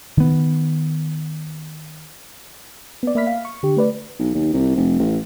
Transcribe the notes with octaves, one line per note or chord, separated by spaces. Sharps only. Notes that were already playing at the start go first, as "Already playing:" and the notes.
D#3 B3
B3 D5
A#3 D5 E5 B5 F6 B6
F5
C#6
D3 G4
A3 B4 D5
B1
D#2
C2
F1
A1